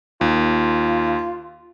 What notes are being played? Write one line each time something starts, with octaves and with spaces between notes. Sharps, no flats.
D#2 F4